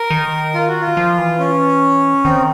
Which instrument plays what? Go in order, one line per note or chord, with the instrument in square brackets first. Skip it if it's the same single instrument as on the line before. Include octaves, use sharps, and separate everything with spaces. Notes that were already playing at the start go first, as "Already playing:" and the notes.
Already playing: [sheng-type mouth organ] A#4
[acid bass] D#3
[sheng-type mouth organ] F4
F#4
F4
[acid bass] F3
E3
[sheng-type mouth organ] C#4
[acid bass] D#3 [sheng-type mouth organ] C4